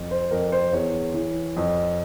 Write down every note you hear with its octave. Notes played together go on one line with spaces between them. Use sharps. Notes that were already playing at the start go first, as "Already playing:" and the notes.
Already playing: F2
C5
F2 A#4
C5
E2 C#5
E3
F2